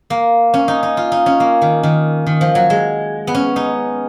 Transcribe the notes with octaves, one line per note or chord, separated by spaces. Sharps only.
A#3
C#4
D#4
D#4
F4
D#4
C#4
A#3
D#3
D#3
D#3
F3
F#3
G#3
B3
C#4
D#4